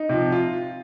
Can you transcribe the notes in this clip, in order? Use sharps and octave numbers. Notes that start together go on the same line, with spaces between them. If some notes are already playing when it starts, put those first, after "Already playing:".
Already playing: D#4
C3 F3
F4